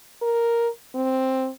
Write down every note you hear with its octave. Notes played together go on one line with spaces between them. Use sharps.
A#4
C4